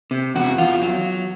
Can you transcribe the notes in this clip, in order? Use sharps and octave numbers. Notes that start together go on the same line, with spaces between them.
C3
E2 F#4
E2 F4
F#3